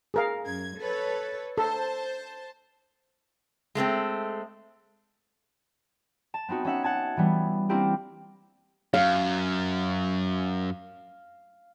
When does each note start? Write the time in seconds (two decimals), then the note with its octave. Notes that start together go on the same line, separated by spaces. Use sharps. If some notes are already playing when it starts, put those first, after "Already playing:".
0.14 G#4 A#4 F5
0.45 F#2 G#6
0.79 A4 B4 C#5
1.58 A4 C5 A5
3.75 G#3 A3 B3 C4
6.34 A5
6.48 B3 C4 D#4 F#4
6.65 C#4 D#4 E5 F#5
6.83 F#5 G#5 A5 G#6
7.17 E3 G3 B3
7.69 A#3 C4 D4 E4 G4 A#4
8.94 F#2 F5